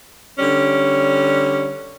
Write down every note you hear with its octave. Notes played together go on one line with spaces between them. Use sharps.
D3 G3 C#4